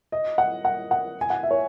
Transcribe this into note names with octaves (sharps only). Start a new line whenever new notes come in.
D#5
F#5
F#5
F#5
G#5
F#5
E5
C#5